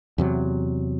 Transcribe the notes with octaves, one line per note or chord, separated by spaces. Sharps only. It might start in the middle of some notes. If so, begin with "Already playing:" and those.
E2 C3 F#3